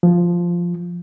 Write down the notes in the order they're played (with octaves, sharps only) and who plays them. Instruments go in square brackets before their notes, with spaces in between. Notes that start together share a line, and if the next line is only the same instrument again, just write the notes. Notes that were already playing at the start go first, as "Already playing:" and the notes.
[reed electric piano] F3